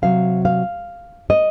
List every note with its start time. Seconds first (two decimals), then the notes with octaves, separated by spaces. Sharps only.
0.02 C3 F#3 F5
0.45 F5
1.30 D#5